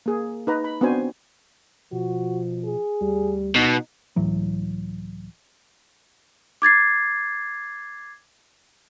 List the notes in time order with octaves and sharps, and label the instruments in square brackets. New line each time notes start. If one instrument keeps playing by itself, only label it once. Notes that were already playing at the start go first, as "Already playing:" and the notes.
[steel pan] A#3 G#4
D#4 B4 A#5
B5
B3 C4 D4 F#4 C5 G#5
[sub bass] B2 [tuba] F3 [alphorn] F#4
[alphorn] G#4
[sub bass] D2 [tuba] G3
[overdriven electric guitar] B2 [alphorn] D#4
[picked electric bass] C#2 A2 E3 F#3
[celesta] D6 G#6 A6 C7